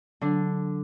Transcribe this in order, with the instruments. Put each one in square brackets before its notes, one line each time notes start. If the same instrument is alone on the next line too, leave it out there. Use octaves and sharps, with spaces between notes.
[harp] D3 D4 [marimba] F#3